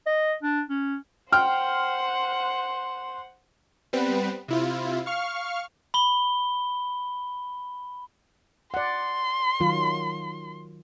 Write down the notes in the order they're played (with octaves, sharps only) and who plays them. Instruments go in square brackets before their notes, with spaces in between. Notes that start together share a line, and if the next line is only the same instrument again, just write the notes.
[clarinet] D#5
D4
C#4
[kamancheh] C5 F#5 [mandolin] G5 [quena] C6 [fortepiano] F6
[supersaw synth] G3 B3 C4 B4
C3 E4 F4
F5 C#6 F6
[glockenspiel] B5 G7
[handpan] D5 F#5 [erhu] C6
[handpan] D#3 F#3 F4